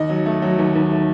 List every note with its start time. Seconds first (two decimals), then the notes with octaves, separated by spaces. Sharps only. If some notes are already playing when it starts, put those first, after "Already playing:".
Already playing: D#2 D#5
0.09 F#3
0.26 A3
0.42 F#3
0.58 D#2
0.75 D#2
0.91 A3